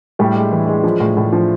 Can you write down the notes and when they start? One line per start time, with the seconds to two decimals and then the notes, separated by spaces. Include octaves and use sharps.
0.19 A2 G3 G4
0.36 G#3
0.52 E3
0.67 G#3
0.84 F3
1.00 A2
1.17 A2
1.33 F3